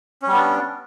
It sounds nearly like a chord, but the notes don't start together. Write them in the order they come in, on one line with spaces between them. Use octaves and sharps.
C#4 G3 B3 D4